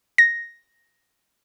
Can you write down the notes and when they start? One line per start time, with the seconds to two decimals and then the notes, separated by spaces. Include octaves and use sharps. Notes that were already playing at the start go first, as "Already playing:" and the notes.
0.18 A#6